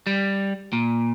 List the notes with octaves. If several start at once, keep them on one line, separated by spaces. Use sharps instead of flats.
G3
A#2